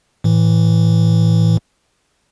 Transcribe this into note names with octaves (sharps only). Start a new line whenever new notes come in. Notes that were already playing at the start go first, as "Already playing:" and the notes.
A2 E3